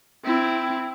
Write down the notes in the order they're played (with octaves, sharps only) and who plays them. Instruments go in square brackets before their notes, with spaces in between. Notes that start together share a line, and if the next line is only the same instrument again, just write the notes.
[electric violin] C4 E4